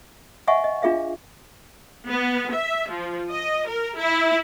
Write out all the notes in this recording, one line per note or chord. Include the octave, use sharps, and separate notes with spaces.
D#5 E5 F#5 G#5 C#6
D#5
D4 F4 G#4 E5 F5
B3
E5
F3
D#5
A#4
E4